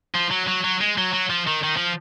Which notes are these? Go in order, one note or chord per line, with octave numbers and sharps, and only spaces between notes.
F3
F#3
F#3
F#3
G#3
F#3
F#3
F3
D#3
D#3
F3